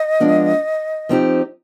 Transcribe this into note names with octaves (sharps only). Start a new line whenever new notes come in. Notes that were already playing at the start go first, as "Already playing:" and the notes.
Already playing: D#5
F3 G#3 B3 D4
F3 C4 D#4 G4